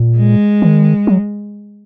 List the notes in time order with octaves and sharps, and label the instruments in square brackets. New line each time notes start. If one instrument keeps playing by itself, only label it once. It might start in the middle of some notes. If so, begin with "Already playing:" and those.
Already playing: [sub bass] A#2
[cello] G#3
[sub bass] D#3
F#3